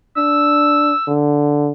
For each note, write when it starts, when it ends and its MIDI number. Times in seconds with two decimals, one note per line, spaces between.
0.17 0.92 62
0.17 1.12 88
1.08 1.72 50